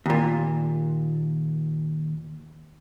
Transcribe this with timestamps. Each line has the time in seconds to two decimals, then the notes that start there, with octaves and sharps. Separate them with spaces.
0.06 D#2 A#2